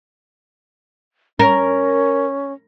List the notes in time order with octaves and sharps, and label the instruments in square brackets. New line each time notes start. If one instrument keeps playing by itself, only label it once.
[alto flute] C#4 [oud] A#4